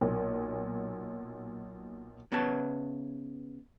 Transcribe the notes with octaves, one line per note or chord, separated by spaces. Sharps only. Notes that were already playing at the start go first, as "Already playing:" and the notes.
B1 A#2
C#3 B3 B4 C#5 A5